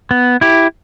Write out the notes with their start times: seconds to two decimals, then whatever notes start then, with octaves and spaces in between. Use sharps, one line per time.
0.11 B3
0.41 E4 G4